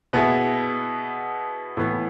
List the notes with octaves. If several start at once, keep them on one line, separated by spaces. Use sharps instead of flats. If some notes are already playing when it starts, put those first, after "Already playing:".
B2 B3 E4 G#4
A2 E3 B3